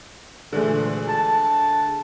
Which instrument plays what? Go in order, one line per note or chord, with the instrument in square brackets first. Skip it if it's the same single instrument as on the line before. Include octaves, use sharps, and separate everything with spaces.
[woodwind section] D2 A#2 E3 [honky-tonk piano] D3 G#3 A3
[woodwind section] A5